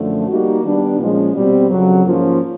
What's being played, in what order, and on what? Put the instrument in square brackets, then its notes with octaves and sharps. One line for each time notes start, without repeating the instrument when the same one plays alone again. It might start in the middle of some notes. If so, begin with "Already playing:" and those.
Already playing: [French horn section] F#2 D3 F3 A3
G3 A#3 D#4 F#4
D#3 G3 B3 D4
A#2 F3 G#3 C#4
B2 G3 C4
F2 C#3 F#3
G#2 F3 A#3 C#4 F4